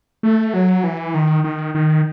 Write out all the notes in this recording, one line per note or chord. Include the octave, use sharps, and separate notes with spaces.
A3
F#3
E3
D#3
D#3
D#3